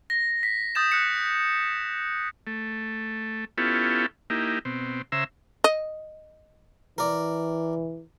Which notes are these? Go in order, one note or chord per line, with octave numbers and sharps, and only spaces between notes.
A#6
B6
D#6 G6 A6 E7
F#6 C#7
A3
B3 C#4 E4 F4 G4 A4
A#3 D#4 E4 G4
B2 C4
C#3 C5 E5 A#5 E6
D#5
E3 A#4 D5